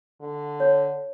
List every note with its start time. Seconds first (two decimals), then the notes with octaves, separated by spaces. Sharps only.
0.21 D3
0.60 C#5